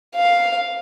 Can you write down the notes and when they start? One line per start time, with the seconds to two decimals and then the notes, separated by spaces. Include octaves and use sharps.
0.16 F5